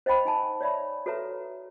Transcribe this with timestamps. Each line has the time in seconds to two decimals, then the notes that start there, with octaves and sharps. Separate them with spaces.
0.06 C5 D#5 F5 G5 B5
0.25 D#4 G#5 A5
0.61 C#5 D5 E5 B5
1.06 F#4 A4 B4 C#5 E5 A#5